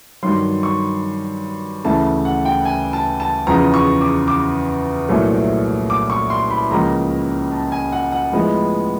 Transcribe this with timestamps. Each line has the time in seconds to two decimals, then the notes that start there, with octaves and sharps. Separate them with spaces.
0.23 G2 D#3 F#3 C6
0.63 C#6
1.84 D2 C#3 E3 A3 A5
2.25 F#5
2.45 G5
2.65 G#5
2.93 A5
3.20 A5
3.47 E2 C#3 F3 A#5
3.74 C#6
4.01 D6
4.28 D6
5.09 C2 A#2 F#3 A3
5.90 D6
6.10 C#6
6.30 C6
6.51 B5
6.71 C#2 C#3 F3 A#3 A#5
7.52 A5
7.72 G#5
7.92 F#5
8.12 F#5
8.33 A2 F3 G#3 B3